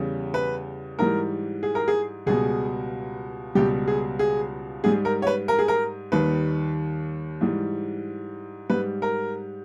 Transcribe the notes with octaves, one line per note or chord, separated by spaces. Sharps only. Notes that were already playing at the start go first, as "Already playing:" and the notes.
Already playing: E2 C#3 G3
B4
G#2 E3 G3 A#4
G#4
A#4
G#4
C#2 B2 G3 G#4
C#2 B2 G3 G4
G#4
G#4
G#2 G3 G#4
A#4
C#5
B4
A#4
G#4
A#4
D#2 D#3 G3 B4
G#2 E3 G3
G#2 G3 B4
A#4